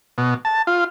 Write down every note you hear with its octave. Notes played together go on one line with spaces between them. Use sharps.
B2
A5
F4